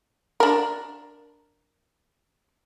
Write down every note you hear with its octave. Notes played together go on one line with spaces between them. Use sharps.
D4 A#4